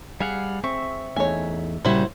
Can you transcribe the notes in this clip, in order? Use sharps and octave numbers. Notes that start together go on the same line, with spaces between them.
G3 G#4 F5 F#5
C4 E5 C#6
E2 A3 D#4 C#5 G#5
A#2 C#3 G3 E4 F#4 C5